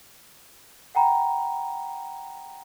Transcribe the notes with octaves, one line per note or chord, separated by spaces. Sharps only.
F#5 G5 A#5 B5